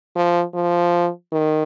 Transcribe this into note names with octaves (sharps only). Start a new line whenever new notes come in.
F3
F3
D#3